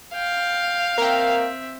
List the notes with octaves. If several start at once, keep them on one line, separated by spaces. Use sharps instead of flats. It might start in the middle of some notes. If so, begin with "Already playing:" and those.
F5 G5
A#3 C4 A#4 E5 G5